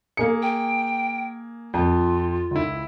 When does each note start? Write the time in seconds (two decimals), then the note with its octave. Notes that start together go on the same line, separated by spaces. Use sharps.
0.17 A#3 G#4 C#7
0.42 G5
1.74 F2 F4
2.51 C#2 E4